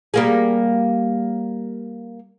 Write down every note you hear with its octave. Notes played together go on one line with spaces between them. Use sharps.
G3 A#3 G#4